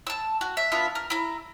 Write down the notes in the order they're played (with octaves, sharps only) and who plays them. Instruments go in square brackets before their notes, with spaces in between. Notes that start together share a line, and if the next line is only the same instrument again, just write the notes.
[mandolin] A5 E6
F#4
E5
B3 D4 F4 E5
A#4
E4 A#5